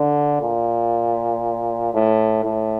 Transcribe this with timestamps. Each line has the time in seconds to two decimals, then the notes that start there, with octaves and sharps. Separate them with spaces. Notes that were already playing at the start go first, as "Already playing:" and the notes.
Already playing: D3
0.42 A#2
1.94 A2
2.44 A2